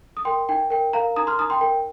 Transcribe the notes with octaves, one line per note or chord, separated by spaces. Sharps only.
D#6
A#4 G5 C6
D#4 G5
A#4 G5
A#4 F5 A#5
D#4 A#5 D#6
C6 F6
D#4 A#5 D#6
G5 C6
A#4 G5